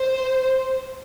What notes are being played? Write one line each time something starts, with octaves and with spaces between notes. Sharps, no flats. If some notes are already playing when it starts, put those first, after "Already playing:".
Already playing: C5